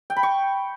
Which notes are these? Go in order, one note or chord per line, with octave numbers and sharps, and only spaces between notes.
G5
B5
C#6